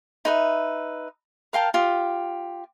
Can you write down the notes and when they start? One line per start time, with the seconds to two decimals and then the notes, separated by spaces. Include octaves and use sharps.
0.25 D#4 B4 E5
1.53 A#4 F5 G5 A5
1.74 F4 G4